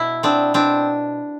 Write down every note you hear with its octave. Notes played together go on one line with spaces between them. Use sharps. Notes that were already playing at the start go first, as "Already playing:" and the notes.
Already playing: B2 E4
B3 C4 D4
B2 C4 D4